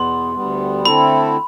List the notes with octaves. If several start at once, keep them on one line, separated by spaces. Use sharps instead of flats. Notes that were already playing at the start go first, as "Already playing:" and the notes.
Already playing: E2 B2 B3 C6
D2 D3 G3 B3
D3 A3 C4 E4 A4 B5